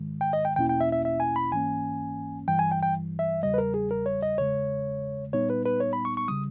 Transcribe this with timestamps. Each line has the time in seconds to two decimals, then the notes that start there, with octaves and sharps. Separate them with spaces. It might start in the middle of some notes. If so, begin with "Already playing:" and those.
Already playing: G#2 D#3 G#3
0.21 G5
0.33 D#5
0.45 G5
0.56 E2 B2 A#3 C#4 E4 G5
0.69 G5
0.81 E5
0.92 E5
1.05 E5
1.20 G#5
1.36 B5
1.52 G#2 E3 A#3 C#4 G#5
2.48 G2 E3 G3 G5
2.59 G#5
2.71 G5
2.83 G5
3.19 E5
3.43 E2 C#3 G3 D#5
3.54 B4
3.58 A#4
3.74 G#4
3.91 A#4
4.06 C#5
4.23 D#5
4.37 E2 C#3 G#3 C#5
5.33 A#2 G3 B3 D#4 C#5
5.50 B4
5.65 B4
5.80 C#5
5.93 B5
6.05 C#6
6.17 C#6
6.28 C#3 G3 D#6